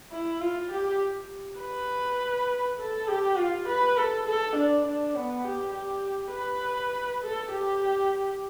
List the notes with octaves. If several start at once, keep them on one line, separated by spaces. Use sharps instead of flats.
E4
F4
G4
B4
A4
G4
F4
B4
A4
A4
D4
D4
B3
G4
G4
B4
A4
G4